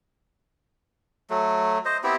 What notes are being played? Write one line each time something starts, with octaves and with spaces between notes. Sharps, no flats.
F#3 A3
C5 D#5
B3 C4 E4 G4